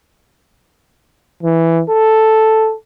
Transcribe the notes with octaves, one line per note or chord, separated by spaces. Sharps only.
E3
A4